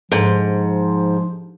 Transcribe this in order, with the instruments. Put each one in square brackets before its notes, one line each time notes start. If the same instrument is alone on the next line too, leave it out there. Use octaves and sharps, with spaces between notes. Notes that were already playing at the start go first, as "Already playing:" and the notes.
[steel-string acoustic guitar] G#2 [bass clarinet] F3